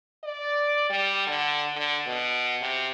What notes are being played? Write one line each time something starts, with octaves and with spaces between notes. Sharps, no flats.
D5
G3
D3
D3
B2
C3